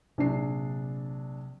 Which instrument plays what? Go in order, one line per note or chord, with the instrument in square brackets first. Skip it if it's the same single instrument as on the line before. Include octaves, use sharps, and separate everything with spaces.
[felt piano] A#1 D4 C7 [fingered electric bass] C3 F#3